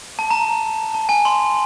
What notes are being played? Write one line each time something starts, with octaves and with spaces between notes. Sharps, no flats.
A5
A#5
A5
G#5
C6